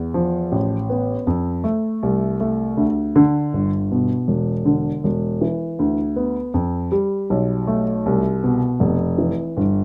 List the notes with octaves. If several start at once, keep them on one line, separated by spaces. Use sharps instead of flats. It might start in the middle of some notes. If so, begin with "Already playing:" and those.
Already playing: E2
F3
A1
B3
F2
A3
C2
A3
D2
D3
G1
B2
E1
D3
E1
E3
D2
B3
F2
G3
B1
A3
C2
B2
F1
E3
G1